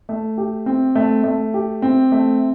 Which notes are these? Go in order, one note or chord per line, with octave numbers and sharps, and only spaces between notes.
A3
G4
C4
A3
A3
G4
C4
A3